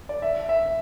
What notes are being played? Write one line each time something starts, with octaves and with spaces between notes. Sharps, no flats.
D5
E5
E5